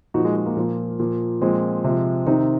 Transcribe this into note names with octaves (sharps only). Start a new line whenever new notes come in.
A#2 F3 D#4 F#4
G#3
G#3
A#3
A#2 F3
A#2 F3
A#2 F3 G#3 C4
C3 F3
C3 D#3 C4 D#4